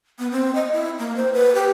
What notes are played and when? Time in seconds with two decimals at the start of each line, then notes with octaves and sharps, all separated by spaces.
0.19 B3
0.31 C4
0.55 D#5
0.72 E4
0.99 A#3
1.16 C5
1.33 B4
1.55 G4